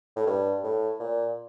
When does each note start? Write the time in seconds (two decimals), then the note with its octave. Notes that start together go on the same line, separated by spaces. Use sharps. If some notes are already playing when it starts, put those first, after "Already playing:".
0.16 A2
0.27 G2
0.63 A2
1.00 A#2